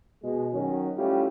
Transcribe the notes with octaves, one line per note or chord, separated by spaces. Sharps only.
B2 G#3
D#3 F#3 C#4
G3 A3 C#4 E4 F4 G4